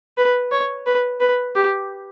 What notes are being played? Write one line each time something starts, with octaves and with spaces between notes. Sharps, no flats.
B4
C#5
B4
B4
G4